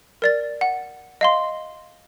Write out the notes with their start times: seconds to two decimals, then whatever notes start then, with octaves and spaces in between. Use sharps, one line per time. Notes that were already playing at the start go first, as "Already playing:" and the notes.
0.22 A#4 D5 A6
0.61 F#5
1.21 D#5 F5 C6